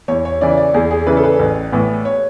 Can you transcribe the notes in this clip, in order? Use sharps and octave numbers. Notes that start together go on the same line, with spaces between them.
E2 C#5
C#5
C#3 E3 D5
D5
E2 G#4
G#4
C#3 E3 B4
A4
B4
A1
A2 E3 B3
C#5